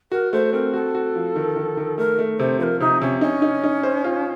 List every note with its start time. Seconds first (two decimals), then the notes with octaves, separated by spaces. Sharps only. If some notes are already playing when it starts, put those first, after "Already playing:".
0.11 F#4 A#4
0.32 A3 C5
0.53 C4 A#4
0.74 F#4 A4
0.95 F#4
1.15 F3
1.36 D#3
1.56 D#3
1.77 D#3
1.98 A3 A#4
2.19 A3
2.39 C3 C5
2.59 F3 A#4 C5
2.80 C3 D#4
3.01 C3 C#4
3.21 C#4 D#4
3.42 D#4
3.64 D#4
3.83 C5
4.04 F4